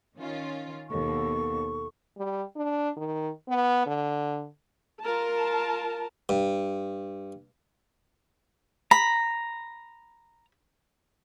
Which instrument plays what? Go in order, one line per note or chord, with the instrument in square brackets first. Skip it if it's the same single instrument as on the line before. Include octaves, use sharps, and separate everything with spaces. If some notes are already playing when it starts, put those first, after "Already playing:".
[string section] D#3 C#4 F4
[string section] D#2 B2 [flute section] A4 C#6
[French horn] G3
D4
D#3
B3
D3
[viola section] F4 A#4 A5
[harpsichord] G2
[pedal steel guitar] A#5 [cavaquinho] B5